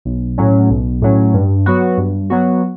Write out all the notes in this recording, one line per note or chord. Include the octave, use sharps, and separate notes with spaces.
B1
A2 F#3 C#4
B1
A2 F#3 C#4
G2
F#3 B3 F#4
G2
F#3 B3 F#4